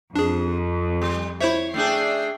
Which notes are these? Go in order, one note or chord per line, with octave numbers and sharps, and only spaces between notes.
F2 D4 G#4
G3
E4 C5 C#5 E5
A3 D4 G#4 D5 G5 C7